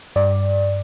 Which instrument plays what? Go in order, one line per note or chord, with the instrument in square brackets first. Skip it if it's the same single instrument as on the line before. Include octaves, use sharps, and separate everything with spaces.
[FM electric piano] G2 D5